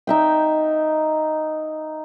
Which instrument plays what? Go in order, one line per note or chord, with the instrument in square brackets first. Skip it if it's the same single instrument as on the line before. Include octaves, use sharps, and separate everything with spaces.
[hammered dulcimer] D#4 E5 G5